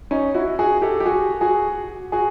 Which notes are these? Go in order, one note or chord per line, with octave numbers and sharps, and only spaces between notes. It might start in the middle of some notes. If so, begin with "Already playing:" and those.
C#4 D#4
E4 F#4
F#4 G#4
G4 A4
G4
F#4 G#4
F#4 G#4
F#4 G#4